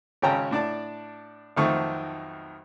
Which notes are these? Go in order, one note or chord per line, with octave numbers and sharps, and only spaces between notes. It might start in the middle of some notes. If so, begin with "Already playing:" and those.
G#1 C#3 C#4 G5 A5 A#5
A2 D4 D5 A5
B1 F2 D#3 A3 C4 C#6